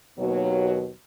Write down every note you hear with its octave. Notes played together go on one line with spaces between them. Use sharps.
D#2 B2 F#3